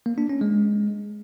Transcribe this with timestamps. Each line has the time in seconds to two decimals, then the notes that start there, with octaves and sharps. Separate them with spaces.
0.06 A#3
0.18 D4
0.29 C#4
0.41 G#3